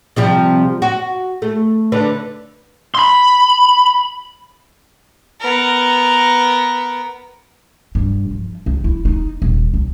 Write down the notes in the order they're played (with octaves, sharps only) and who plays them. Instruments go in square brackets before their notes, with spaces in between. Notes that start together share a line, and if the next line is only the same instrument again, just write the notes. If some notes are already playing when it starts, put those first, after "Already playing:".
[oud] C3 F3 G3
F#4
A3
D3 D4 B4
[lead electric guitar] B5 C6
[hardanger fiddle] B3 A#4
[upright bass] G2
F3
C#2
E4
D#4
D#1
C#2